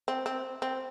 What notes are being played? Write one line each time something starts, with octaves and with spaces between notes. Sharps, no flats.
C4
C4
C4